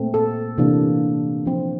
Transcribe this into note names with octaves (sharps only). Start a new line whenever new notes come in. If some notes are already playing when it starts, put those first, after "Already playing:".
Already playing: A#2 A3 C4
A4
C3 E3 A#3 D4
F3 C4